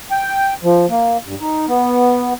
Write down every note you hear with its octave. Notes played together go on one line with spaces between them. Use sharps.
G5
F3
A#3
G2
D#4
B3